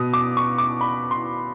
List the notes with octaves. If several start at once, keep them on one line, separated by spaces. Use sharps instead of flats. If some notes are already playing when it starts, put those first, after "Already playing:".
Already playing: B2 D#6
D6
C#6
D6
B5
C6